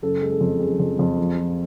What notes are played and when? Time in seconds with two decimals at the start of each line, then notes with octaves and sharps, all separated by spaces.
0.02 F#1 A4
0.22 G#3
0.32 A4
0.41 F2
0.60 F#1 G#4
0.80 F2
0.99 F2
1.18 F3
1.37 F3